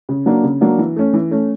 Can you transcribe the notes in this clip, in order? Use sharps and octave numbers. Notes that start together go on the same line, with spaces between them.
C#3
F#3 A#3 D4
C#3
F#3 A#3 D4
E3
A3 C#4
E3
A3 C#4